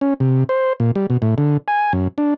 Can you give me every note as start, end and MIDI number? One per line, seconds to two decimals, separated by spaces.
0.01 0.14 61
0.20 0.44 48
0.49 0.73 72
0.80 0.91 46
0.95 1.06 55
1.10 1.17 47
1.22 1.35 45
1.38 1.57 50
1.68 1.93 80
1.93 2.08 42
2.18 2.34 62